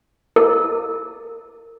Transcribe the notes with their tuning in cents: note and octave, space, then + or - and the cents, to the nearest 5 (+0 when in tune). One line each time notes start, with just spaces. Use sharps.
A#4 -30